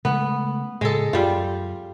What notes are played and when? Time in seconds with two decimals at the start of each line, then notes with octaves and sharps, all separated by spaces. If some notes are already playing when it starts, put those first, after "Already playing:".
0.05 C#3 G#3 A3 B3
0.81 A2 C#3 G#3 A4
1.13 F#2 G3 F4